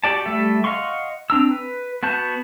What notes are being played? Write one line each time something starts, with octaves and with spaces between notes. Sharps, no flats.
F#4 G4 D5 A5
G3 A3 A4 E5
D#5 F5 F#5 C6 C#6
C4 D4 A#5 E6
B4
B3 F#4 A5 G6